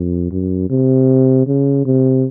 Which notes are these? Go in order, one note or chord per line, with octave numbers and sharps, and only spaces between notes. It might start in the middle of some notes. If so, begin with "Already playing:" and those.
Already playing: F2
F#2
C3
C#3
C3